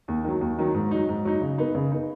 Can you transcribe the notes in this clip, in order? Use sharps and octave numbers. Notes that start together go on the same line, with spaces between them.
D#2
D#3 F#3
D#2
D#3 F#3
G#2
F#3 D#4
G#2
F#3 D#4
C#3
B3 D#4
C#3
B3 D#4